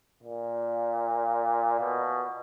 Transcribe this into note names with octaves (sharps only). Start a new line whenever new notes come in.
A#2
B2